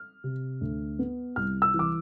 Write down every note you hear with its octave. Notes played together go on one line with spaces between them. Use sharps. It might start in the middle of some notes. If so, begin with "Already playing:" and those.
Already playing: F6
C3
D2
B3
C2 F6
E6
E3
D6